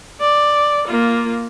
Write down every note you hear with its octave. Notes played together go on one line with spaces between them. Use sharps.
D5
A#3 F4